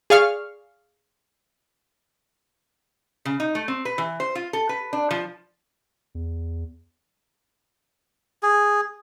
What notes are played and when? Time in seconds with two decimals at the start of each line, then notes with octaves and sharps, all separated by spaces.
0.10 G#4 D5 F5 C#6 F6
3.25 C#3
3.40 D#4
3.55 A3
3.68 C4
3.85 B4
3.98 E3
4.20 C5
4.35 F4
4.53 A4
4.69 B4
4.93 D4
5.11 F3
6.15 E2
8.43 G#4